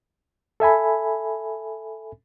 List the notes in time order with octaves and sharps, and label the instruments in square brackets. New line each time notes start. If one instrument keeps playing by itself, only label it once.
[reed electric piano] A4 E5 G#5 B5